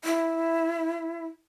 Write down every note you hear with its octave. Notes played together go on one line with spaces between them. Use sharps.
E4